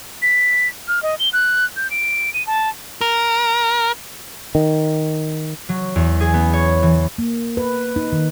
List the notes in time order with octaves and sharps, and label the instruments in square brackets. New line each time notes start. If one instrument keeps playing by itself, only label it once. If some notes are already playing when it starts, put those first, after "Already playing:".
[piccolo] B6
F6
D#5
G7
F#6
G6
D7
D#7
A5
[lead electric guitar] A#4
[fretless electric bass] D#3
[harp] F#3
E2
G#4
B3
C#5
E3
[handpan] A#3
B4
D#4
D#3